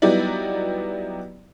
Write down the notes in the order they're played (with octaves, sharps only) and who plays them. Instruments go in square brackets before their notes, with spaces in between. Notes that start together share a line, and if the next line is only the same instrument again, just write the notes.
[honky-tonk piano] F#3 G3 B3 D#4 E4 D5